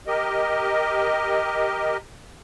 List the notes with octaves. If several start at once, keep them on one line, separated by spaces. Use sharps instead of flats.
G4 A#4 D#5